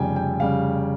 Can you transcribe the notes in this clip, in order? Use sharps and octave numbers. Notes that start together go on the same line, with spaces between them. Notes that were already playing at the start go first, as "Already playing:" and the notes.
Already playing: F1 F2 C#3 G3 G5 G#5
G5
C#3 G3 F5